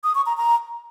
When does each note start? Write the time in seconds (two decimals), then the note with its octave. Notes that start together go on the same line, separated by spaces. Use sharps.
0.04 D#6
0.15 C#6
0.26 A#5
0.37 A#5